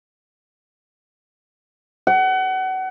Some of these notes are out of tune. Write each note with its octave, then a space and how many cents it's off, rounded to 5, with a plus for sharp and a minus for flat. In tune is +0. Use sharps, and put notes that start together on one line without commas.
F#5 +30